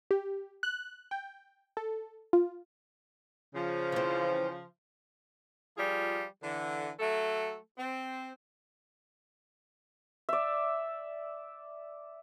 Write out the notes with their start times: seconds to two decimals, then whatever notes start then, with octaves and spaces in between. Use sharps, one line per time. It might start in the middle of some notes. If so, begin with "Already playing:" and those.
0.11 G4
0.63 F#6
1.11 G5
1.77 A4
2.33 F4
3.55 C#3 F3
3.92 E3 C4
5.77 F3 G3 F4 G#4
6.43 D3 E3
7.00 F#3 A3 A4
7.79 C4
10.29 D5 E5